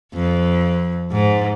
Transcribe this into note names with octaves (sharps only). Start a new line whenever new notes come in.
F2
G#2